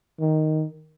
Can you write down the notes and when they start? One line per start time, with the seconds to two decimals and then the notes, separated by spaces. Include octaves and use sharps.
0.20 D#3